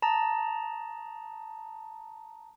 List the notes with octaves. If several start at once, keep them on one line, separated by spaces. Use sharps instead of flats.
A5 A#5 D#6